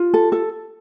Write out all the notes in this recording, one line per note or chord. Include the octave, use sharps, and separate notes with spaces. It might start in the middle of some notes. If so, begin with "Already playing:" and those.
Already playing: F4
A4
A4